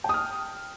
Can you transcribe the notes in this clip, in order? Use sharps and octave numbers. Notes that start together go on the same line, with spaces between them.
G5 D#6 F6